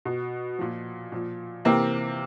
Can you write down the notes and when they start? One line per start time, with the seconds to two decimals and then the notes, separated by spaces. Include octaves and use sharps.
0.05 B2
0.59 A#2 F3
1.12 A#2 F3
1.65 C3 E3 A#3 C4